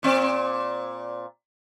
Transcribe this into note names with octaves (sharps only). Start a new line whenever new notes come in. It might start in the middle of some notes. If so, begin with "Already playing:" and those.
A#2 C4 D5